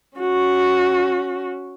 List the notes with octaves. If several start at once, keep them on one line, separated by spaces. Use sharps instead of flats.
C#4 F#4